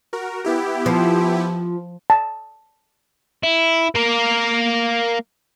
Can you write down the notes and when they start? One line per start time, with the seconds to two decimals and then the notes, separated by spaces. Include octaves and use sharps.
0.13 F#4 A#4
0.45 B3 E4 G4
0.86 F3
2.10 A5
3.43 E4
3.95 A#3 A#4